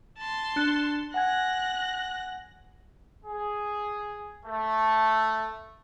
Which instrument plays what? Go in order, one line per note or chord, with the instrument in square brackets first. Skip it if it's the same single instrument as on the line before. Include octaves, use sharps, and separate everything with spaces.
[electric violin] A5 C6
[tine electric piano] D4 F#6 C#7
[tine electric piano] F#5 G#5 G#6 [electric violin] F#6 A#6
[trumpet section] G#4
A3